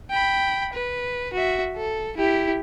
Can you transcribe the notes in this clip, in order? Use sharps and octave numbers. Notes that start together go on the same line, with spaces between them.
G5 B5
B4
F#4 E5
A4
E4 G4